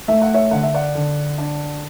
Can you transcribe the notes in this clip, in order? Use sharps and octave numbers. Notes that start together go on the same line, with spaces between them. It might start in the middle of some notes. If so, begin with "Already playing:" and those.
A3 E5
F#5
C#5 E5
D3 F#5
E5
D5 F#5
D3
D4